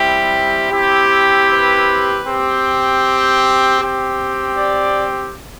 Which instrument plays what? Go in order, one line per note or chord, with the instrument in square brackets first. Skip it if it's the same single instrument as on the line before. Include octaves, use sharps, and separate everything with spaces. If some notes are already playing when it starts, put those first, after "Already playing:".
Already playing: [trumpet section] G3 C4 E4 G4
C4 E4 G4
B4
C4 G4
C4 G4
D5